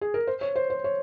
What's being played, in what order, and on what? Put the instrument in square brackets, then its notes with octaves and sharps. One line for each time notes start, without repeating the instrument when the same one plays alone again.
[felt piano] G#4
A#4
C5
C#5
C5
C5
C#5